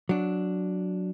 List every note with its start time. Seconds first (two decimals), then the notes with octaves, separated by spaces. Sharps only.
0.09 F#3 D4